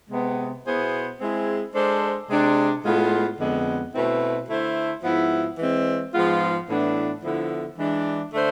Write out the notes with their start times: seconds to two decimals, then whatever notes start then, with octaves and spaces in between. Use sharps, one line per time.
0.10 C3 G#3 B3
0.65 B2 B3 E4 G#4 C5
1.20 G#3 C4 E4 G#4
1.74 G#3 D4 A4 C5
2.30 C3 G#3 D4
2.84 A2 G#3 B3 F4
3.39 F2 D3 G#3 B3
3.94 B2 A3 C4 E4 B4
4.49 D3 A3 E4 A4 C5
5.03 G#2 F3 B3 E4
5.58 E3 G#3 C4
6.13 G#2 F3 G#3 B3 F4
6.68 A2 E3 B3 D4
7.24 D3 F3 B3 E4
7.77 E3 G#3 D4
8.32 D3 A3 D4 A4 C5